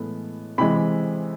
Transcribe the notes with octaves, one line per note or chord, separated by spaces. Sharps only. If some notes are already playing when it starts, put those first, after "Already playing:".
Already playing: A2 E3 G#3 B3
C3 E3 G#3 B5